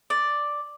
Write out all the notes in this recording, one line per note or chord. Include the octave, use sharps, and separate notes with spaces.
D5